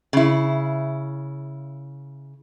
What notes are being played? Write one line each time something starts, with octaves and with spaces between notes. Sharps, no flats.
C#3 E4